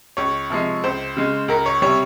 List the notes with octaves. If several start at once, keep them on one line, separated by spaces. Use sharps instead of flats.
C#2 C#5
C3 F3 G#3
C#2 C5
C#3 G#3
C#2 A#4
C#5
C3 G3 C#5